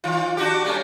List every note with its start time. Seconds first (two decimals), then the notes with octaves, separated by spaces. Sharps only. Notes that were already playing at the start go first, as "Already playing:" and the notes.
0.04 D#3 F4
0.37 D4 F#4 G4
0.65 G3 A3 C#4